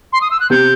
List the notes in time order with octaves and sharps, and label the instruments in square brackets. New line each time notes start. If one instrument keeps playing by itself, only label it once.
[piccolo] C6
D#6
E6
F#6
[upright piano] C3 C4 [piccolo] G6